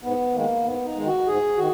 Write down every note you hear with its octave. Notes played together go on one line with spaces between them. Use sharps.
G#2 B3
D#3 G#3 A#3
G#2 B3
D#4
D#3 G#3
F#4
G#2 G#4
D#3 F#4